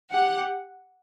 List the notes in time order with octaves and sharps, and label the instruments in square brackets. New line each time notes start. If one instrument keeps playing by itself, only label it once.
[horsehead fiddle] G4 [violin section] F#5